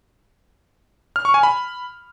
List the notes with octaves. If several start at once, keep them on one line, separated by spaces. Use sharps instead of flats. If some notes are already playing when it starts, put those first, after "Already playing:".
F6
C#6
G#5
B5